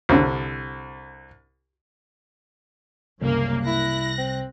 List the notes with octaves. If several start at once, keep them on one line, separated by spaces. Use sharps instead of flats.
C2 D3
C2 F#2 C#3 A#3
E4 F#6 A#6
C4